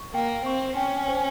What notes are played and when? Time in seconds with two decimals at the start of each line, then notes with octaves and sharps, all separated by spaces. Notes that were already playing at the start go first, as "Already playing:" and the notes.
Already playing: C#6
0.14 A#3 G5
0.46 C4 C#6
0.77 C#4 G5
1.08 C5